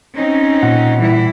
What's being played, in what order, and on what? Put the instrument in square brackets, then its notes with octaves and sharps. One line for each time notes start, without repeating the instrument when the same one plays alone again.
[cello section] C4 C#4 D#4
[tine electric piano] A#2 F#5
[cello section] E3 G3 E4